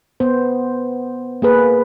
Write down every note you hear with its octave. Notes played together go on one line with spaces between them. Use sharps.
B3 C5
A#3 G#4 B4